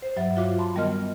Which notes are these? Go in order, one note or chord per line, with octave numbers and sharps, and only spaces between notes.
C5
G2 F#3 E5 A6
F4 F#4 C#5 E5 F5 D6
A5 B5 C6
D#3 G3 B3 A#4 D#5 F6